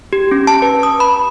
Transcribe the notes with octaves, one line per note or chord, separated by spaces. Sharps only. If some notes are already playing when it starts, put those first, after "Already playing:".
G4
C#4
A5
B4
D#6
B5